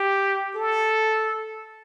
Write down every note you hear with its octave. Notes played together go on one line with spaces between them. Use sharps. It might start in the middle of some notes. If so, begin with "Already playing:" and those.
Already playing: G4
A4